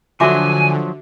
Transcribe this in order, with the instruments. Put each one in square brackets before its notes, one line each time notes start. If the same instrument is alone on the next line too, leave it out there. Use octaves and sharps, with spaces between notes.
[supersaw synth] D3 [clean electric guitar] F3 F#3 [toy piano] F#4 E5 D6 [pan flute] G#5